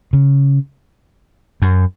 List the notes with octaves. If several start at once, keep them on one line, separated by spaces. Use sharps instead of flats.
C#3
F#2